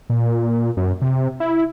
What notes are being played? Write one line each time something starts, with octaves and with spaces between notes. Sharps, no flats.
A#2
F#2
C3
E4